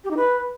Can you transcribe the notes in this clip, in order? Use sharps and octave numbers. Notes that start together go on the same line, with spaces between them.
G4
D#4
B4